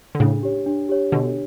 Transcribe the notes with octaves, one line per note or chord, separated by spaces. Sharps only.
D3
A2 C#3 D4
G4 C#5
D4
G4 C#5
B2 D3 D4